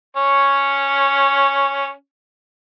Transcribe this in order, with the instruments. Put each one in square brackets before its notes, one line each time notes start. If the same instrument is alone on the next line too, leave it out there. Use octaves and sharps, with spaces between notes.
[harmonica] C#4 C#5